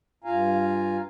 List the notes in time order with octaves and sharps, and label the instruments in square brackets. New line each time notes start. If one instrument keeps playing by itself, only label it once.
[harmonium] G2 F4 F5 G#5 A#5